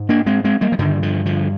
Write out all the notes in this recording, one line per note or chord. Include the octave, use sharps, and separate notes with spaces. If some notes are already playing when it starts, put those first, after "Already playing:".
Already playing: G#2
A#3 D4
G#3 C4
G#3 C4
G3 A#3
F3
G2 D3 D#3 G3
D3 F3
D3 F3